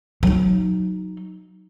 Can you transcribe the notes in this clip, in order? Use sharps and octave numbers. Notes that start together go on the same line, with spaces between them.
F#3 D#4